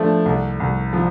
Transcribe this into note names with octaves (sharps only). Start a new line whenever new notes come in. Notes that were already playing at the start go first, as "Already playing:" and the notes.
Already playing: F3 A3 D4
C2
C2
F3